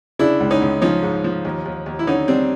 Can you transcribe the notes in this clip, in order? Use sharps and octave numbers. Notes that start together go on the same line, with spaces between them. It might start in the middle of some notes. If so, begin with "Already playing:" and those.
C#3 D4 E4
C#2
C#4 D#4
C#2
F3 C#4 D#4
G#2
F3
D#2
D#2
D#2
E4
D3 C#4 D#4
G3 C4 D4